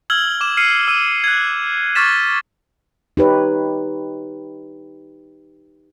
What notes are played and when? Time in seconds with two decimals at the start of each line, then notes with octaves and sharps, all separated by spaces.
0.10 E6 F6 G#6 F#7 G7
0.41 D6 E7
0.57 F6 C7 C#7 D#7
0.88 E6 D#7
1.24 F#6 G#6
1.95 C#6 D6 F6 A6 B6 E7
3.17 D#4 G4 B4 C#5